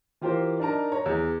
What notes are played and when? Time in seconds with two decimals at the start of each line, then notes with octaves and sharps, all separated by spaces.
0.21 E3 F4 G4 A#4 C5
0.59 D4 D#4 A#4 A5 A#5
0.92 C#5 A#5
1.06 E2